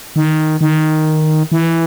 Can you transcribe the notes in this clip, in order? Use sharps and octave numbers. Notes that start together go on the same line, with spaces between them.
D#3
D#3
E3